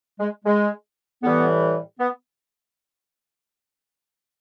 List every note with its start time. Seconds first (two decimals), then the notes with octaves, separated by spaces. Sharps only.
0.19 G#3
0.45 G#3
1.22 A2 E3 G3 B3
1.99 B3